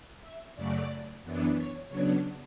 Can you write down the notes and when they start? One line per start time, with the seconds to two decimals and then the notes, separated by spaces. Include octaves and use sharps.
0.22 E5
0.55 F#2 C#3 F#3 A3 D5
1.22 F#2 E3 B3 D4
1.56 C#5
1.89 C#3 F#3 B3 D4 C#5